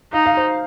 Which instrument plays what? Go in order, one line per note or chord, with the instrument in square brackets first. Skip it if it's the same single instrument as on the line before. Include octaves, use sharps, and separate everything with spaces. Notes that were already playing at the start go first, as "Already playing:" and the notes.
[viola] D#4 [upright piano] F5
[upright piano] F5
C5